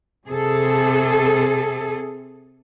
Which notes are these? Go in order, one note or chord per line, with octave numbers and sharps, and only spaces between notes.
C3 G#4 A4